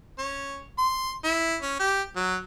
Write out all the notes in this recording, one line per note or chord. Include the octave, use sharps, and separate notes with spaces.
C#4
C6
E4
C#4
G4
F#3